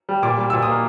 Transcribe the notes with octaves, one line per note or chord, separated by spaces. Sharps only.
G3
A#2 D6
G3
A#2 E6
D#6
A#3